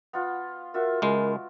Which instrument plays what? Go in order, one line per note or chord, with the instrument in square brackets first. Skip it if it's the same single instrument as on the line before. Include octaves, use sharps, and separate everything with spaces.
[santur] B3 F4 F5
[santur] F4 F#4 E5 [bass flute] A#4
[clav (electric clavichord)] C#2 G#3 [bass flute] A#4